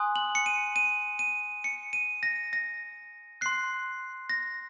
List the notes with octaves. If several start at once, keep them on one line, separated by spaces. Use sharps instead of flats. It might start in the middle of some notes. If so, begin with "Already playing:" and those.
Already playing: G#5 C6 D#6 F#6
F#7
C#7
D#7
D#7
D#7
C#7
D#7
A#6
A#6
C6 F#6 C7
A#6